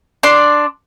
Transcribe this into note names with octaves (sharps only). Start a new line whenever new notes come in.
D4 D5 C6